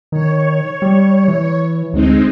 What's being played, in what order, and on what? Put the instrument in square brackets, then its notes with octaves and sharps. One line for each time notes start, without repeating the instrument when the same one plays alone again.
[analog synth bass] D#3 [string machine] C#5
[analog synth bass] G3
E3
[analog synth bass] D2 [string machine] G#3 C4 D#4